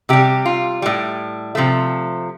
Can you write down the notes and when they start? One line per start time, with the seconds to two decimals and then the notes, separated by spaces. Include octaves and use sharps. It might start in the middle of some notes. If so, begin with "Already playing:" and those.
0.09 C3 G3 G4
0.46 F4
0.82 A2 G3
1.55 C3 F3 A3